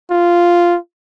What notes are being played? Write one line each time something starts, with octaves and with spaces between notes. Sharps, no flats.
F4